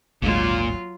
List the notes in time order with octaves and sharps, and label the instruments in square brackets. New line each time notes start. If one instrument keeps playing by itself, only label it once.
[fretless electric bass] G#1 D2 G#3 [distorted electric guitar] A#2 [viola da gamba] F#3 F4